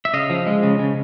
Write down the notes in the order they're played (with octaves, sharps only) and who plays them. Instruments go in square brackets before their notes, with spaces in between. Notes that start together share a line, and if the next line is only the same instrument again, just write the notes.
[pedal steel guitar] E5
C#3 D#5 F5
F3
G#3
C#3
C#3